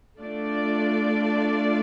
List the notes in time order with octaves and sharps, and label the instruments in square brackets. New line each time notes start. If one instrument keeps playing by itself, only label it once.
[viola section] A3 D4 F4 D5